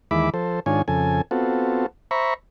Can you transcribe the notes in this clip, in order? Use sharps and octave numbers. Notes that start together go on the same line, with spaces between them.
D#2 E3 G#3 E5 B5 D6
F3 A4 C5
G#2 D#3 D4 F4 C#5 G#5
F2 C#3 A4 G#5
B3 C4 F4 F#4 A4
C5 E5 A#5 B5 C#6